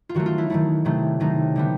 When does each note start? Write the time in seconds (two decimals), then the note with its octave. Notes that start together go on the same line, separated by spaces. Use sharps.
0.09 F4
0.15 D#3 F#3 A3 F#4
0.26 F4
0.38 E4
0.50 D#3 F#3 A3 E4
0.85 C3 D#3 F#3 A3
1.20 C3 D#3 F#3 A3 D#4
1.56 D3 G3 B3